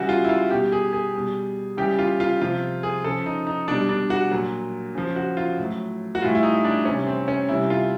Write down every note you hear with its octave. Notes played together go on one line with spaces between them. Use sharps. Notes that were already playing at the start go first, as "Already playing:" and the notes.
Already playing: C#3 E3 G3 F#4
F4
E4
F4
B2 G3 G4
G#4
G#4
B2 G3
C#3 E3 G3 G4
F4
F4
C3 F3 F4
G#4
C#3 F3 A4
D#4
D#4
B2 G3 D4
D4
F#4
A#2 F#3
C#3 F3
F#4
F4
A2 F#3
F#4
A2 E3 G3 F4
E4
D#4
D4
C3 E3 G3 C#4
C4
C#4
C3 E3 G3 E4
F4